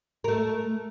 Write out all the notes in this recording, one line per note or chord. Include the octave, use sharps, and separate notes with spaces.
A3 A#4